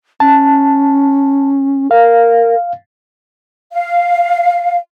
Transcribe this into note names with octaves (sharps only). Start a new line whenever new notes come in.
C#4 A5
A#4 F5
F5